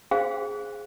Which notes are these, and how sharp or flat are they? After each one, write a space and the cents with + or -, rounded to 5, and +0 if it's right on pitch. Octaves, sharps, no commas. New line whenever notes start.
G#4 +0 C5 +0 F5 -5